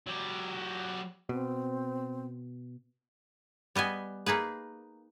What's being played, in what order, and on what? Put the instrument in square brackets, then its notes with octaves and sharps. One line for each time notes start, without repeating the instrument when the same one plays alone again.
[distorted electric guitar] F#3 G4
[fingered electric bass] B2 [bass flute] C4
[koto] G3 B3 D#5 G#5
A#3 D#4 G#4 B4